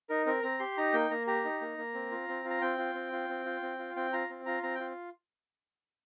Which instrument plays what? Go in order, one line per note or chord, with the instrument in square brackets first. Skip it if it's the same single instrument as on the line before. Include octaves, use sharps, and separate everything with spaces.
[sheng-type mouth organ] D#4 A#4
C4 A#4
C4 A#5
G4 C6
D#4 A#5
A#3 G5
A#3 A#5
G4 A#5
D#4
A#3
A#3
C4
F4
C4
F4
A#5
C4 G5
F4
C4
F4
C4
F4
C4
F4
C4 G5
F4 A#5
C4
F4 A#5
C4 A#5
F4 G5